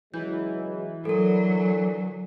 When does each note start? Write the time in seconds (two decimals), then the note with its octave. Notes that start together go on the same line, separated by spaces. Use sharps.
0.14 C#2 E3 F#3 G#3 G6
1.05 D3 F#3 A4 A#4